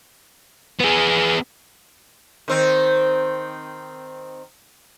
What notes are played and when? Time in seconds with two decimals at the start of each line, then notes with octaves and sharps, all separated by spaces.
0.80 B3 G#4
2.48 D#3 C4